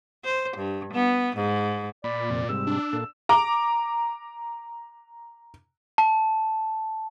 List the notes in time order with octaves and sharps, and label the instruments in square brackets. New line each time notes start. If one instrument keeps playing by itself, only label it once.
[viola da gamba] C5
G2
B3
G#2
[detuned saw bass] A#2 [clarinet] D5 [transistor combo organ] B5
[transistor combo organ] F2 C3
[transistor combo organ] G#2 C3 G3 [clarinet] E6
[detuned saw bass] D4
[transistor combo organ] A#2 A4
[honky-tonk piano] A#5 D6
[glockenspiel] A5